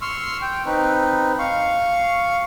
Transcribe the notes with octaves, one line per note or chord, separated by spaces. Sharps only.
C6 C#6 E6 F6
G5
C4 D#4 B4
F5 C#6